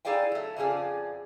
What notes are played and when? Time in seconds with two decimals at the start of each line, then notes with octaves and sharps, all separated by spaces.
0.05 D#4 E4 G#4 D5 F5 G5
0.32 F#3 A3
0.56 F2 C#3 F3 G#4 D5